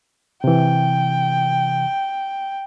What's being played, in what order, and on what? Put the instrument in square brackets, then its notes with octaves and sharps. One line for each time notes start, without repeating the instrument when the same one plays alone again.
[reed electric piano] C3 E3 [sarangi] G5